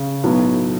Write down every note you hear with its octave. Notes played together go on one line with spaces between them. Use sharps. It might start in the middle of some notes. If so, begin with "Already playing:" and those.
Already playing: C#3
B1 A2 F#3 B3